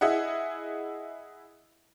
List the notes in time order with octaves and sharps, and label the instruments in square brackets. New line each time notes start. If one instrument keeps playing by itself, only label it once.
[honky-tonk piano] E4 G#4 D#5 E5 F#5